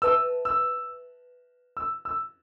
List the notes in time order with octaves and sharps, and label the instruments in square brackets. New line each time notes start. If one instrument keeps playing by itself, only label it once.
[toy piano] B4 E5 A5 [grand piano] E6
[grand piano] E6
E6
E6